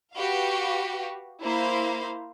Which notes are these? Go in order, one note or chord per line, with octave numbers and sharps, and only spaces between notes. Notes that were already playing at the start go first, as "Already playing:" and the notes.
F#4 G4 B4 F5
A#3 E4 C5 F5